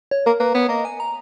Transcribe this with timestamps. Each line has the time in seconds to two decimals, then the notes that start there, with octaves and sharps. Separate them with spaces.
0.11 C#5
0.26 A#3 A#4
0.40 A#3 B4
0.54 B3 C#5
0.68 A#3 D#5
0.85 G#5
1.00 A#5